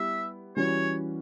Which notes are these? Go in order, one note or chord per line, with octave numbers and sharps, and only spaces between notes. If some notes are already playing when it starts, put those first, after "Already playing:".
Already playing: G3 B3 E4 G4 E5
E3 G3 C#4 F#4 C#5